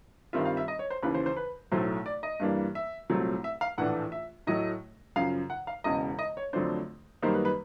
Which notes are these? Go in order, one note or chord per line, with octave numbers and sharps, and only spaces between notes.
G2 D#3 G3 C4 F4 E5
F5
E5
D#5
C#5
C5
D#2 C#3 E3 B4
C5
C5
B4
B1 A2 F#3 A3 C5
D5
D#5
G2 E3 G3 A#3 D4
E5
C2 A#2 F#3 A3 C4
E5
F5
A#1 A2 E3 A3 D4 F#5
E5
A2 F#3 A3 D#5
F#2 C#3 F3 F5
F#5
F5
E1 E2 C#3 D#5
D#5
C#5
F2 D3 F#3 A3 D4 C5
F#2 D#3 G3 A#3 D#4 C5
B4
B4